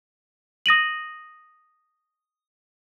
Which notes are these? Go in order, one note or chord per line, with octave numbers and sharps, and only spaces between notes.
D#6 A#6 D#7 F#7